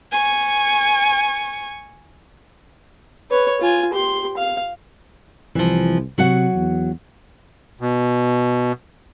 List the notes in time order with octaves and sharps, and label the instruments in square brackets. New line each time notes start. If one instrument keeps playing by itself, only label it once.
[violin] G#5 C#6
[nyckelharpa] B4 C#5
F4 G#5
G4 C6
F5
[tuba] C2 [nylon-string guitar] E3 F3
[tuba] C3 [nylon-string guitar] F#3 F#4 F#5
[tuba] E2
[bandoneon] B2